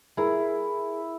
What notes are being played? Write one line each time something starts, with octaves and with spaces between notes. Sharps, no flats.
E4 G#4 A#4